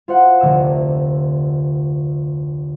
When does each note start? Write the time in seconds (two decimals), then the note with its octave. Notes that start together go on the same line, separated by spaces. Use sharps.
0.08 F4 F#4 C5 F5 F#5
0.40 F1 D2 D3 A#5 E6 E7